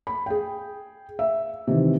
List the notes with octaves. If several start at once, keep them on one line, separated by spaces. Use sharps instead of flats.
B5
G#4 G5
E5
C3 D#3 E3